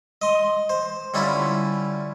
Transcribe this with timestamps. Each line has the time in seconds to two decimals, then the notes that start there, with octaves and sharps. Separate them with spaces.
0.22 D#5 C6
0.69 C5
1.14 D3 G3 C#4 D4 E4 F4